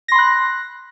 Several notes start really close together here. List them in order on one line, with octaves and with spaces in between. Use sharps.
A#6 C6 B5 F#6